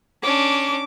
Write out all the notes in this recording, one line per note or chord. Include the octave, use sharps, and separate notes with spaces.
C#4 D4 D6